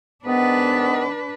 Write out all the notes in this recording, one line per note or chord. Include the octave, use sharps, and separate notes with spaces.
G#2 D#3 B3 D4 B4